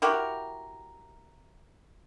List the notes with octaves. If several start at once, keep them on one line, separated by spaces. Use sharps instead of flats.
E4 F#4 G4 A#4